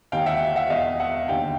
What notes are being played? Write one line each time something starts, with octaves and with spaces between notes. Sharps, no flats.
D#2 D#3 F5 G5
E5 F#5
E5 F#5
E2 B2 D#5 F5
E5 F#5
D#2 D3 F5 G5